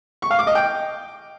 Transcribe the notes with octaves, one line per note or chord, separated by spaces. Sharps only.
C#6
F5
D6
D#5
G5